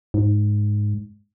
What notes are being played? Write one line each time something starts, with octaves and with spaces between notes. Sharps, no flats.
G#2